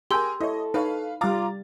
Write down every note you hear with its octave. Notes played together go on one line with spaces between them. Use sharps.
G4 G#4 A#4 G#5 C6 E6 G6
E4 A4 C#5 D#5
D#4 B4 C#5 F5
G3 F4 F5 A#5 D6 A6